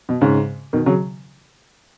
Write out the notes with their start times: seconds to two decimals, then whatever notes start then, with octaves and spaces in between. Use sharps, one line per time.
0.09 B2
0.21 G#2 C#3
0.73 B2 D#3
0.86 C#3 F#3